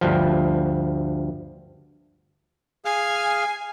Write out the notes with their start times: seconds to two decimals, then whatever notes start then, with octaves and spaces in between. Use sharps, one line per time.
0.01 D2 G2 F3
2.85 G#4 F5 G#5 F6